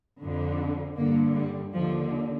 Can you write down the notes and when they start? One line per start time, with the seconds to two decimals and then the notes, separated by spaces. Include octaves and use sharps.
0.20 F2 D3
0.96 G2 D3 A#3
1.35 G3
1.73 D#2 D3 F3